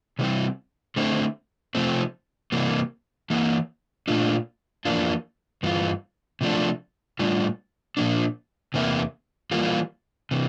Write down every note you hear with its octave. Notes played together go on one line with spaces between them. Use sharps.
C3 E3 G3 C4 E4
D3 A3 C4 E4
C3 F3 A3 C4
C3 E3 G3 A#3
E3 A#3 E4
A#2 A3 D4 F4
F2 E3 A#3 D4 F4
G2 E3 F4
C3 F3 A3 D4
A2 G3 D4 F4
A#2 F3 A#3 D4
E2 C3 E3 A#3 E4
E3 G3 A#3 F4
C3 E3